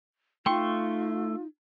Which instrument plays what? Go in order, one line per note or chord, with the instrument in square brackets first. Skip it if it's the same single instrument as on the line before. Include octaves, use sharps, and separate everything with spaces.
[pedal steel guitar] A3 C6 C#6 [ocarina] D#4 [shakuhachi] F4 [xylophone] G5